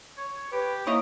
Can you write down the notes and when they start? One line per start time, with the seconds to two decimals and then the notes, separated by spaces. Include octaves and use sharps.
0.17 C#5
0.52 G4 B4
0.87 A#3 E4 C#5 D#5 D#6